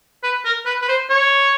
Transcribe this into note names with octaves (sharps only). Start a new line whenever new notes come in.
B4
A#4
B4
B4
C5
C#5